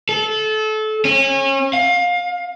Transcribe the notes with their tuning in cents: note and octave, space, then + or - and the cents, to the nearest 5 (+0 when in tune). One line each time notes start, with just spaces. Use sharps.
A4 -25
C#4 -30
F5 +25